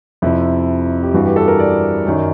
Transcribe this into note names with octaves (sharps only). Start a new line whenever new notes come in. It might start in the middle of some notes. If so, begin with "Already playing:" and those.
F2 C3 F3 E4
G4
G2 E3 F#4
G4
A4
A#4
D5
F#2 D#3 F#3